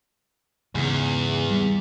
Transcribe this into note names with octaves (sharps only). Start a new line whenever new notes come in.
E2 G#2 C#3
G3